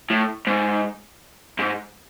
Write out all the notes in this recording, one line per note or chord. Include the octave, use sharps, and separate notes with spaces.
A2
G#2
G#2